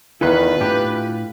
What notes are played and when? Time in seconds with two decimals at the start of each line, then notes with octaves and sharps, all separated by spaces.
0.21 E2 D#3 E4 F4 A4 B4 G#5 C6
0.61 A2 D4 G4